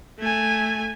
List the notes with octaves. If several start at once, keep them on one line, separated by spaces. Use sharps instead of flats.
A3 G#5